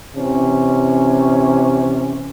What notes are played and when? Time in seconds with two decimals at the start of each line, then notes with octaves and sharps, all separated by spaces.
0.16 C3 E3 C#4